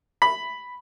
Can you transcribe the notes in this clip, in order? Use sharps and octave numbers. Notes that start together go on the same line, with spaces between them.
B5